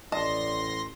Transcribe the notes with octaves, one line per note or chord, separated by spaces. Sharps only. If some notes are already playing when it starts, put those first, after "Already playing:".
A1 D5 D#5 A5 C6 A#6